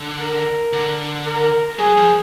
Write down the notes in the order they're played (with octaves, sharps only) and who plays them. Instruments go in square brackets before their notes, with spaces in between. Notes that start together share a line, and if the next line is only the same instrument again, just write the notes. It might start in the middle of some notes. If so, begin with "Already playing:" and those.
Already playing: [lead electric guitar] D3
[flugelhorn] A#4
[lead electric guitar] D3
[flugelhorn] A#4
[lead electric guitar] F#3 [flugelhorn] G#4
[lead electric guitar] F3